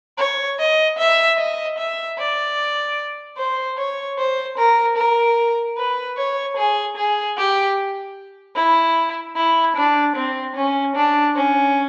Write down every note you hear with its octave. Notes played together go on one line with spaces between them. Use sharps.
C#5
D#5
E5
D#5
E5
D5
C5
C#5
C5
A#4
A#4
B4
C#5
G#4
G#4
G4
E4
E4
D4
C4
C#4
D4
C#4